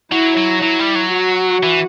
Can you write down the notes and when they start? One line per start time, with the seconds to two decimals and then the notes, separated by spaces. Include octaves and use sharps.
0.11 F#3 E4
0.37 F#3
0.62 F#3 E4
0.79 G3
0.95 F#3
1.13 F#4
1.63 E3